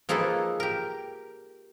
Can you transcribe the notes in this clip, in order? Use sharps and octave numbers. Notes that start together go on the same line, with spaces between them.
F3 A#3 D#4 G#4 A4 B4
G4 A#4